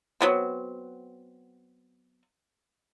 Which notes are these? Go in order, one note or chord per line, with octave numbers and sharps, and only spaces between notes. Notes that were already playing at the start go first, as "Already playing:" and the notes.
F#3 B3 C4